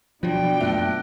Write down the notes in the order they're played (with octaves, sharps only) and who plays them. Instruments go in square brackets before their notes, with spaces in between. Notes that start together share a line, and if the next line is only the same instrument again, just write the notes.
[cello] B2 G5 [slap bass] F3 F#3 [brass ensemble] D4 [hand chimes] F4 F#4
[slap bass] F#2 A3 B3 [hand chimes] E5 F#6